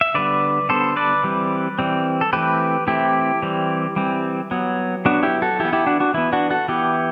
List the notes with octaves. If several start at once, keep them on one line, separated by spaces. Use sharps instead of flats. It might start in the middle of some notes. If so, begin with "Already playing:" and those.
E5
D3 G3 B3 B4 D5
D3 G3 B3 A4 C5
B4 D5
E3 G3 C4
E3 G3 C4
A4
E3 A3 C4 G4 B4
E3 A3 C4 E4 G4
E3 G3 C4
E3 G3 C4
F#3 B3
F#3 B3 D4 F#4
E4 G4
F#4 A4
E3 E4 G4
B3
E4 G4
D4 F#4
D4 F#4
E3 B3 E4
D4 F#4
F#4 A4
E3 B3 E4 G4